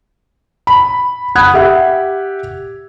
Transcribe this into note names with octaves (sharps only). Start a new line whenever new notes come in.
B5
F#5 B5 D#6 F#6 G#6
G4 E5 F#5